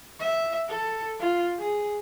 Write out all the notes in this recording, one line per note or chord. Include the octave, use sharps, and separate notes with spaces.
E5
A4
F4
G#4